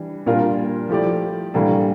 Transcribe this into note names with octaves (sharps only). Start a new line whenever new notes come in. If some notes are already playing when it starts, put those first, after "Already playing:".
Already playing: E3 G3 D4
A#2 G3 D4 F4 A#4
F3 A3 E4 G4 D5
A2 E3 G3 A#3 D4